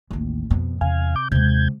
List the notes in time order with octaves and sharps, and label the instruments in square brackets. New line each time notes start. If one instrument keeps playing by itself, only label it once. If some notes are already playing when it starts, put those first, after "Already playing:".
[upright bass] A1 D#2
F2 B2
[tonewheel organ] E2 F5 G#5 [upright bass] C3
[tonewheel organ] D6 G6
[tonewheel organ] D#2 G6 G#6 [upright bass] C3 G#3